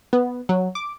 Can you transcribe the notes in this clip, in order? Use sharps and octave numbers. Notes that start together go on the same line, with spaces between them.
B3
F#3
D6